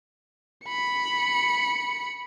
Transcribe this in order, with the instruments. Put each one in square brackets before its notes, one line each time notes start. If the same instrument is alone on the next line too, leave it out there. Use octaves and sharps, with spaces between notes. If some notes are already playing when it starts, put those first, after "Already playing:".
[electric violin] B5 C#7